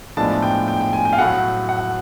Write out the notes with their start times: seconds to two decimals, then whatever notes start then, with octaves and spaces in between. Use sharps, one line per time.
0.17 A2 F3 G#3 B3 D4 A5
0.42 G5
0.68 G5
0.81 G5
0.93 G#5
1.05 G5
1.13 F5
1.18 A2 F#3 A3 F#5
1.69 F#5